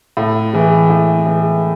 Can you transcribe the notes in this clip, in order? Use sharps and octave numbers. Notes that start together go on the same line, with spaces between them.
A2
E3 G#3
A2
E3 G#3